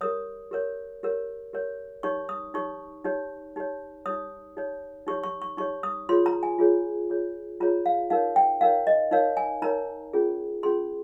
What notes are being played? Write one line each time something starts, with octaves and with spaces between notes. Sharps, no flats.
G4 A#4 C#5 D#6
G4 A#4 C#5
G4 A#4 C#5
G4 A#4 C#5
D#4 G4 C#5 C#6
D#6
D#4 G4 C#5 C#6
D#4 G4 C#5
D#4 G4 C#5
D#4 G4 C#5 D#6
D#4 G4 C#5
D#4 G4 C#5 C#6
C#6
C#6
D#4 G4 C#5 C#6
D#6
F4 G#4 C#5 C6
A#5
G#5
F4 G#4 C#5
F4 G#4 C#5
F4 G#4 C#5 A#5
F5
D#4 A#4 C#5 F5
G5
D#4 A#4 C#5 F5
D#5
D#4 A#4 C#5 F5
G#5
D#4 A#4 C#5 A#5
C#4 F4 G#4
C#4 F4 G#4 C6